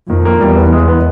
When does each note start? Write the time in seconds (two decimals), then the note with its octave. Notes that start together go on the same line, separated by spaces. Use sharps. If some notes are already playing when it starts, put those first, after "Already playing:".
0.09 F2 D#3
0.25 A#3
0.40 E2 G3
0.56 B3
0.72 G#3
0.88 B3